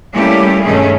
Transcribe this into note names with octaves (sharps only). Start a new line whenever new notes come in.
G3 A3 A#3 C#4 E4 G4
G2 B2 D#3 A3 C#4 G#4